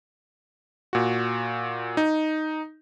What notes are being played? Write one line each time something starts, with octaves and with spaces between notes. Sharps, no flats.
A#2 F#4
D#4